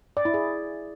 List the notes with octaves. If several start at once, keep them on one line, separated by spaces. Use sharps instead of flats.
D5
E4
G#4